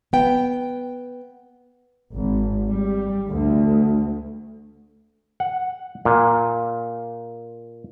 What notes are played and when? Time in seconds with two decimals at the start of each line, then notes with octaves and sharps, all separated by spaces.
0.13 B3 G5
2.14 G#1
2.68 G3
3.28 D2
5.40 F#5
6.05 A#2